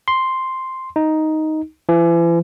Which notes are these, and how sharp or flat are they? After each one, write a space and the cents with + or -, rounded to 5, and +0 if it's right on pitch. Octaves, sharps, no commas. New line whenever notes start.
C6 +0
D#4 +5
E3 +40